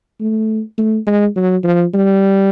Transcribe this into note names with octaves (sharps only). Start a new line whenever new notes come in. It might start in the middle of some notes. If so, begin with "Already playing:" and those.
A3
A3
G#3
F#3
F3
G3